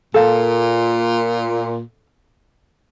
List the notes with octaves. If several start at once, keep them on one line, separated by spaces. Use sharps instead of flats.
A#2 A4 F5